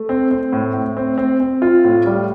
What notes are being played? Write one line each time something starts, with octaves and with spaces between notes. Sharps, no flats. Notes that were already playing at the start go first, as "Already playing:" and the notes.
Already playing: A3
C4
C4
A2
A2
C4
C4
C4
F4
A2
G3